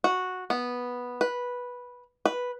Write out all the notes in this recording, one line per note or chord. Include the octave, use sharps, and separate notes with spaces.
F#4
B3
B4
B4